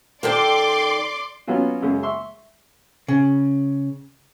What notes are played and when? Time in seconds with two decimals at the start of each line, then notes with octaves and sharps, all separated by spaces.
0.23 D#3 A4 D5 G5 C6 D6
1.48 F#3 B3 C#4 F4 F#4
1.82 F#2 C#3 G#3
2.03 E5 C6 C#6
3.08 C#3